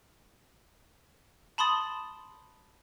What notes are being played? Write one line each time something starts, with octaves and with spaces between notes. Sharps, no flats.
A5 B5 C6 D#6 A6